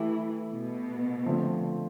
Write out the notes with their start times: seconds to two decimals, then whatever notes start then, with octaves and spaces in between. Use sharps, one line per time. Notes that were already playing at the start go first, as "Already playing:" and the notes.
Already playing: E3 A3 E4 G4
0.52 B2
1.25 D3 F3 A3 C4